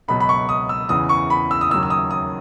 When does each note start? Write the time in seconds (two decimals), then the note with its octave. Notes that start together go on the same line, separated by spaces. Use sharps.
0.08 C#2 B2 F#3 B5
0.20 B5
0.29 C#6
0.49 D#6
0.69 E6
0.89 E2 C#3 E3 D#6
1.09 C#6
1.30 B5
1.51 E6
1.61 D#6
1.71 D#2 C#3 F#3 E6
1.83 E6
1.90 D#6
2.11 D#6